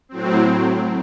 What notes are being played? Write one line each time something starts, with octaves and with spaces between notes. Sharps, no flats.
A2 F#3 C4